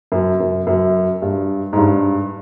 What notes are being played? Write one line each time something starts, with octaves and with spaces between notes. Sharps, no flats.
F#2
F#2
F#2
G2
G#2
G2